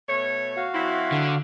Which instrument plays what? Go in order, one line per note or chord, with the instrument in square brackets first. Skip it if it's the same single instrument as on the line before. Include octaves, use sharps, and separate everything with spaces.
[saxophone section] B2 A3 C#5
[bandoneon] F#4 F5
[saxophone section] F#3 C4 E4
[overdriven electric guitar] D3